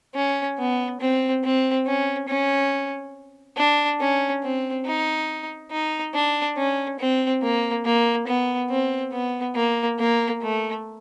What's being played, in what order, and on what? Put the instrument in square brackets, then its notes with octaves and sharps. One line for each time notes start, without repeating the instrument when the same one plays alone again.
[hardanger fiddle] C#4
B3
C4
C4
C#4
C#4
D4
C#4
C4
D#4
D#4
D4
C#4
C4
A#3
A#3
B3
C4
B3
A#3
A#3
A3